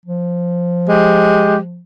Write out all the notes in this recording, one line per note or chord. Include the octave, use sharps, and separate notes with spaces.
F3
G#3 G4